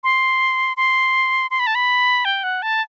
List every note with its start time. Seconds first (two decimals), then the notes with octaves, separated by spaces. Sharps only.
0.04 C6
0.77 C6
1.51 C6
1.60 B5
1.67 A5
1.75 B5
2.25 G5
2.44 F#5
2.62 A5